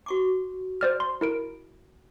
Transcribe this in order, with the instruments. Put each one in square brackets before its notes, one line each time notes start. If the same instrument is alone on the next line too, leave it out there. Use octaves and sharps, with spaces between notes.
[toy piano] F#4 C#6 D6
[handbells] C5 D5 F6
C6
E4 A#4 D7